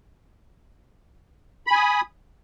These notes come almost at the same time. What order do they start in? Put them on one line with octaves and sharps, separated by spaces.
B5 G#5 D#6